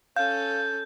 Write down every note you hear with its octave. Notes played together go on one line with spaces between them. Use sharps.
C#4 A4 F5 G6